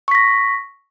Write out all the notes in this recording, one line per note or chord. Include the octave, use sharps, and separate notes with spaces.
C#6 A#6 B6